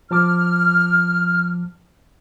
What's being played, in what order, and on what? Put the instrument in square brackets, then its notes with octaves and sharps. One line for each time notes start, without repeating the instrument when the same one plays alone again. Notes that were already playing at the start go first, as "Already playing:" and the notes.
[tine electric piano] F3 A5 D6 [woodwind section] F6